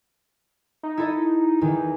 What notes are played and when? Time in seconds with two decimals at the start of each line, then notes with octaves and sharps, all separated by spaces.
0.83 D#4
0.98 E4 A4 D#5
1.61 E2 D#3